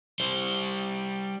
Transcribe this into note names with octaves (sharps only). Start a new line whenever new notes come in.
G3 C5